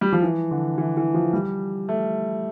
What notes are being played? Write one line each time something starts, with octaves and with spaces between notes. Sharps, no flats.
G3
F3
E3
D3
E3
E3
F3
G3
A3